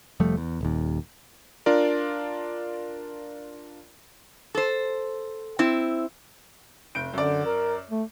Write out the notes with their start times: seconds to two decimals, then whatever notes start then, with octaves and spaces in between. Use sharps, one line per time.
0.20 F1 F3 G3 A3
0.37 E2
0.61 D#1 D#2
1.66 D4 F4 A#4 D5
4.55 A4 C5
5.59 C4 E4
6.95 F1 G6 D7
7.14 F#2 D3 D5
7.45 A#4
7.90 A3